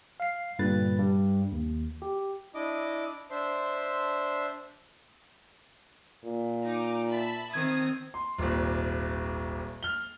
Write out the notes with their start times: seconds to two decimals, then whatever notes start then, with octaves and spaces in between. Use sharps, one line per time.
0.20 F5 C7
0.59 G2 A#2 D3 B4 A6
0.98 G2
1.52 D#2
2.02 G4
2.55 D4 E4 D#5 D6
3.31 D4 C5 E5 C6
6.24 A#2
6.65 D#4 D6
7.08 E5 A5 B5
7.53 D#3 C4 D#6 G#6
8.14 C6
8.38 D#1 G#1
9.83 F6 G7